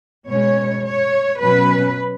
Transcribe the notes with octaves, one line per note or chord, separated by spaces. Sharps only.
B2 G#3 C#4 C#5
C#5
B2 F#3 C#4 B4